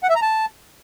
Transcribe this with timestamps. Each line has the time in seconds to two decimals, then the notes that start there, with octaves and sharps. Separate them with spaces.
0.03 F#5
0.09 E5
0.16 A#5
0.22 A5